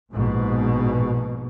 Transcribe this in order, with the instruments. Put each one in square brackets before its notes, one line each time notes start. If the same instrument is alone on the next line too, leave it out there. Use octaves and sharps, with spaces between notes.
[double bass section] A#1 G#2 B2